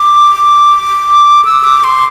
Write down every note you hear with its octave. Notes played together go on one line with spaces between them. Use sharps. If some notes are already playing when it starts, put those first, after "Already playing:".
Already playing: D6
E6
D6
C6